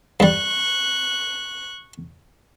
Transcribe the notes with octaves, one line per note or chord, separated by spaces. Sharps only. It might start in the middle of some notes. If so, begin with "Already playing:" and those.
G2 G3 C#6 F#6